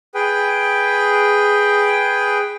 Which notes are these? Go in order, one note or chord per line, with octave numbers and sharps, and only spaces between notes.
G#4 B4 G5